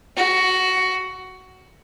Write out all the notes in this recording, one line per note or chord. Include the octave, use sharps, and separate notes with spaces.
F#4